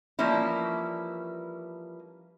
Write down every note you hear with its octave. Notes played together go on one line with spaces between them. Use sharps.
E3 F3 G3 A#3 C#4 E4